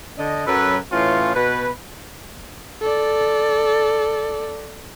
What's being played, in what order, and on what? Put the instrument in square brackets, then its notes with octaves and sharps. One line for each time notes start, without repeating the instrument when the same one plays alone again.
[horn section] D3 D4 D#5
F#2 F#3 A4 B4
A2 E3 C#4 F4
B2 B4
[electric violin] A4 D5